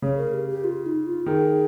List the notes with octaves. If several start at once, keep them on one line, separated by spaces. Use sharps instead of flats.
C#3 C#5
A#4
G4
G4
F4
D#4
F4
D#3 G#4